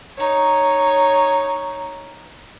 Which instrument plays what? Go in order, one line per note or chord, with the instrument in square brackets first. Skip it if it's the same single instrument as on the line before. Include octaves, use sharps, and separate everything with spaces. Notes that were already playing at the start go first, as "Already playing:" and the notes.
[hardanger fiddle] D#4 C#5